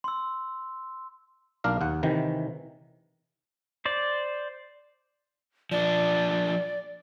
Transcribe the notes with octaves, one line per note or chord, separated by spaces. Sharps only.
C6 E6
B1 A#3 D4 A#4 F5
D#2 F#5
C3 D#3 E3
C5 D5
F3 D4 D5